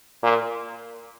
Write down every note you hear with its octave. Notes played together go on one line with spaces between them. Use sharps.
A#2